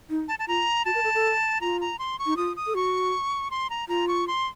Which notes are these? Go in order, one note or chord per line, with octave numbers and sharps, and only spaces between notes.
D#4
A5
A5
F4 A#5
F#4 A5
A#4
A4
A4
F4 A#5
A#5
C6
C#6
D#4
F4 D#6
D#6
A4
F#4 C#6
C6
A#5
F4 A#5
C#6
C6